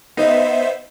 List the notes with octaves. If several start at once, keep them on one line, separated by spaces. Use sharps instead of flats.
B3 D#4 C5 E5